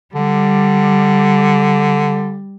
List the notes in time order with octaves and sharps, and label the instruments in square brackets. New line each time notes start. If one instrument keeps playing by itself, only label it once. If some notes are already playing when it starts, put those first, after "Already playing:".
[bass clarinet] D3 [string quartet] G3